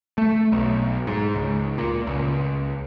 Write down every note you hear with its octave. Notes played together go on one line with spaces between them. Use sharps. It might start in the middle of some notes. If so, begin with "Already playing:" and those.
A3
B1
G#2
C#2
A#2
C#2